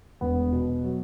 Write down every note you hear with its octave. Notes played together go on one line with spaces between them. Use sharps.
E1 B3
B2
F#3